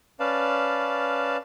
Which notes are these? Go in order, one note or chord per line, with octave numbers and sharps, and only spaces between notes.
C#4 B4 D5 F5 A5